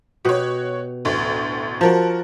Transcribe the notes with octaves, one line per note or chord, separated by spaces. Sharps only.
B2 F#4 G4 C#5
A1 D2
F3 F#4 A#4 A5